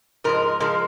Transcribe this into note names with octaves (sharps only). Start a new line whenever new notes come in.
G#2 F3 G#3 A#4
F3 G#3 A#4